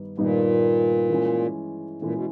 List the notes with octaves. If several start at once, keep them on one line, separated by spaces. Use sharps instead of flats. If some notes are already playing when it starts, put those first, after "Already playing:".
Already playing: G2 D#3 G3 B3 D#4
G2 A#2 D#3 G3 B3 D#4
E3 G#3 C#4
A#2 E3 G#3 C#4
B2